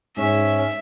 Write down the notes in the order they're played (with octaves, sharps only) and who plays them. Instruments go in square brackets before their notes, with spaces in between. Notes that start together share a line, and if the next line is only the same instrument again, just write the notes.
[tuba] G#2 [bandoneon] C#4 [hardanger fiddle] E5